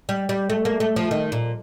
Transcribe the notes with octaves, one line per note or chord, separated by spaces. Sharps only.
G3
G3
A3
A#3
A3
F3
D#3
A#2